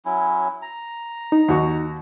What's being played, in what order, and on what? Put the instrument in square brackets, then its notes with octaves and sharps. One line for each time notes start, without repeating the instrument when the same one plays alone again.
[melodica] F#3 C#4 E4
A#5
[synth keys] D#4
[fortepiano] D#2 F#4 C#6